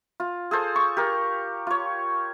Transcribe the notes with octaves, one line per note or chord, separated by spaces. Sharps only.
F4
G#4 A4 C5
C#6
G4 A#4
F4 C#5